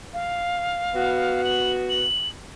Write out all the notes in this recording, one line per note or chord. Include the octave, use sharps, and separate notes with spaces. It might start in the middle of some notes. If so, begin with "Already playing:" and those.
F5
B3 F#4
F#7
F#7